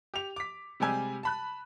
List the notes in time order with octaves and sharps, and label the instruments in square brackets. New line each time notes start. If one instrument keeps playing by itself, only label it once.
[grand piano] G4 F7
D6 B6
C3 G3 G#3 G4 G#5 E6
A5 B5 F#6